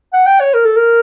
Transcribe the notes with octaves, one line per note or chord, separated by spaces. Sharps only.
F#5
G5
C#5
A#4
A4
A#4